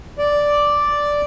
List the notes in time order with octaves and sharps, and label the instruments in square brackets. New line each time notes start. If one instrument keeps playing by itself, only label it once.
[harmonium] D5